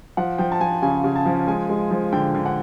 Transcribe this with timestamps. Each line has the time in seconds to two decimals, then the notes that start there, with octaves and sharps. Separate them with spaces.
0.17 F3 F#5
0.38 F3 G5
0.52 A5
0.60 F3 G#5
0.82 C#3 G#5
1.04 C#3
1.16 A5
1.26 F3
1.47 G#3 G#5
1.69 G#3
1.91 F3
2.13 D3 G5
2.35 D3
2.46 F#5